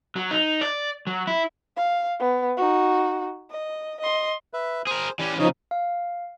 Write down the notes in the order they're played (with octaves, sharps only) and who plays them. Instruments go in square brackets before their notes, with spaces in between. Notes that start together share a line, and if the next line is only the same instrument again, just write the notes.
[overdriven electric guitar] F#3
D#4
D5
F#3
E4
[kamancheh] F5
B3
D#4 F#4
D#5
D#5 C6
[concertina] B4 E5
[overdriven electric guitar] G#4 A#4 [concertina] C5
[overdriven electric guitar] E3 C#4 [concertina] G4 D5 G#5
[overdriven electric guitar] C#3 [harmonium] F3 D#4 [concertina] C#5 D#6
[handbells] F5